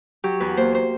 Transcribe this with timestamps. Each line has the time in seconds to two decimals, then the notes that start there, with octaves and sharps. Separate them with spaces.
0.24 F#3 G4
0.40 E2 B4
0.57 A#3 C5
0.75 C5